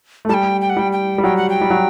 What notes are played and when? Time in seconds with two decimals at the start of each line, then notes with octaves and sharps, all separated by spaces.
0.25 A3
0.29 G3 G5 A5
0.61 G5
0.70 F#5
0.77 G3 G5
0.92 G5
1.18 G3
1.24 F#3 G5
1.37 F#5
1.50 G5
1.61 G3
1.70 F#3